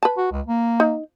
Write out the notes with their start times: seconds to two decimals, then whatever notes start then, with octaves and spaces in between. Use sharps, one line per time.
0.03 B4 A5
0.17 F#4
0.31 C#2
0.47 A#3
0.80 D#4